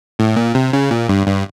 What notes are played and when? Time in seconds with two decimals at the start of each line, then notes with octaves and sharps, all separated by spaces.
0.19 A2
0.36 A#2
0.54 C3
0.73 C#3
0.91 A#2
1.09 G2
1.27 G2